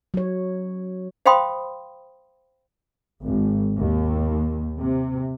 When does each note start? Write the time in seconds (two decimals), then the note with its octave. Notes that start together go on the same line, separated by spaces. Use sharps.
0.14 F#3 C#5
1.26 C5 F5 G5 B5 C6 D#6
3.24 G#1
3.78 D#2
4.80 C3